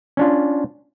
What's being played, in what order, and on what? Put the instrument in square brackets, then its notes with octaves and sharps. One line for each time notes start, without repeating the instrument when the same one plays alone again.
[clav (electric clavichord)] C#4 D4 F4